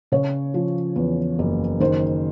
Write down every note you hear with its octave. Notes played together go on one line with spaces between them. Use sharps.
C#3 C#5
F3
E2
F#1
D#3 C5